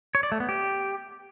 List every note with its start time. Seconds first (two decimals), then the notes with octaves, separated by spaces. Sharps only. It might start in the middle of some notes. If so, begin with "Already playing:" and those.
0.15 C#5
0.23 D5
0.32 A3
0.40 B3
0.49 G4